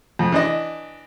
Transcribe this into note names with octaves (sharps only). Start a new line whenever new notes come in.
F2
E3 D4 D#5